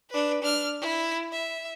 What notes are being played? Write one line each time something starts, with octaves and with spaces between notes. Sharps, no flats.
D4 B4
D4 F6
E4
E5